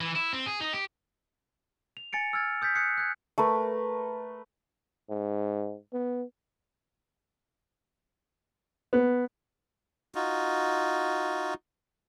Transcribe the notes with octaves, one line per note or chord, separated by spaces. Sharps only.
E3
E4
C4
G#4
D#4
G4
F7
G#5 A6 C#7 D7
E6 F6 G#6 A6
D#6 G6 A6 B6
D#6 F#6 G#6 C7 C#7
F#6 G#6
A3 A#4 B4
G#2
B3
B3
D#4 F4 F#4